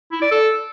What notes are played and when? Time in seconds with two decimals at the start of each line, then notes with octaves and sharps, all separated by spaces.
0.12 E4
0.22 D5
0.32 A4